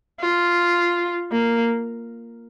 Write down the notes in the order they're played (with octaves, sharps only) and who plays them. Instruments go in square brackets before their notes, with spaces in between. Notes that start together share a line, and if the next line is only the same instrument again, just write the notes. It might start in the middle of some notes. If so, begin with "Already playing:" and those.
[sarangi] F4
A#3